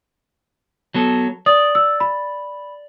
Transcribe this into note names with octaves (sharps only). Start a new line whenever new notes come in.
F#3 B3 A4
D5 D#6
E6
B5